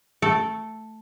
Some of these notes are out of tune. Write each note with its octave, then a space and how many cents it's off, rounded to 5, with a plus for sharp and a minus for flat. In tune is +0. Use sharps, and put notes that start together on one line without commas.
A3 +0 A4 +0